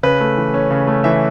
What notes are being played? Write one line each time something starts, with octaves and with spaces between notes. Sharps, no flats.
C#3 B4
A3
E3
C#4
C#3
A3
E3 E5